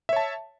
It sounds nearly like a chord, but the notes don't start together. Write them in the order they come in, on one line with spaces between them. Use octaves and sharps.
E5 C#5 A5